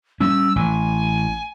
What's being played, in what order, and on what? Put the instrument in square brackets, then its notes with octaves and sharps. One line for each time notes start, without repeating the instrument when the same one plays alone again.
[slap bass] G3 C#4 [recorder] E6
[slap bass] A1 [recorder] G#5